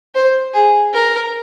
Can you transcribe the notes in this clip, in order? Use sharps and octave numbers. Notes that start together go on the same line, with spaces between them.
C5
G#4
A#4